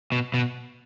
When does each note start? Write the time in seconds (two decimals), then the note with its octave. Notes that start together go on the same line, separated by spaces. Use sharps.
0.12 B2
0.34 B2